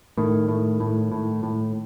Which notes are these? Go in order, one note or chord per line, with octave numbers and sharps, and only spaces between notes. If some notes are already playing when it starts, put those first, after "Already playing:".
A2 D#3
A2
A2
A2
A2